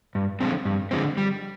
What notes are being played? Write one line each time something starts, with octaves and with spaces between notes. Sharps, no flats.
G2
D3 F3 G#3 C4
G2
D3 F3 G#3 C4
G3